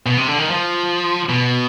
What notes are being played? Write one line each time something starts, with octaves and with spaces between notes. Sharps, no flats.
B2
C3
D3
D#3
F3
B2